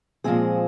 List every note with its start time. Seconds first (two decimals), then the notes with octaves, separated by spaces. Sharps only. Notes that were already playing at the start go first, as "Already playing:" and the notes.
0.24 A#2 F3 G#3 C4 G#4 C5